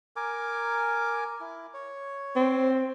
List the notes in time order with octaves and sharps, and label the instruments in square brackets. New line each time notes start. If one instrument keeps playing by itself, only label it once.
[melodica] A#4 G#5 D6
E4
C#5
[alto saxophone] C4